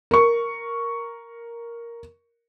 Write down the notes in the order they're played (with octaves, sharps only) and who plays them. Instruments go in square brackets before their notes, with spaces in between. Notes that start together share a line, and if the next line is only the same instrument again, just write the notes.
[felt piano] A#4 C#6